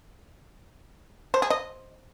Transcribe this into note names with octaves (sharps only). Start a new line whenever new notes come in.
C5
G#4
D#5